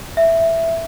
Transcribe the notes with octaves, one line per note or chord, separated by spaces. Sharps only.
E5